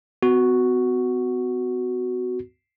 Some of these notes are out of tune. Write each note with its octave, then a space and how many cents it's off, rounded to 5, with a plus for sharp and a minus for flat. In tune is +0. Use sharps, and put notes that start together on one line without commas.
B3 +40 F#4 +0